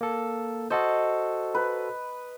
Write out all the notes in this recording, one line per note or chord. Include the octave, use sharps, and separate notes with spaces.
A#3 A4
F#4 A4 C5 D#5
B4